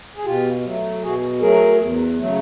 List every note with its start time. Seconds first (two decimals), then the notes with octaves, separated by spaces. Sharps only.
0.17 G#4
0.25 B2 F4 G4
0.64 F#3 A3
1.03 B2 F#4 G#4
1.41 F#3 A3 G#4 A#4
1.80 E2
2.18 C#3 F#3 A3